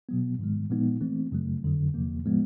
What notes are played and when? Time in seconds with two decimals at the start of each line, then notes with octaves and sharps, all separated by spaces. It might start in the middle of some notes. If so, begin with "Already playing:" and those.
0.09 B2 F#3 B3
0.39 G#2 D#3 G#3
0.70 A#2 F3 G#3 B3 D#4
1.01 E3 A3 C4
1.32 F#2 C#3 F#3 A3
1.63 F2 D3 F#3
1.94 E2 C3 F3 A#3
2.25 A2 F3 G#3 B3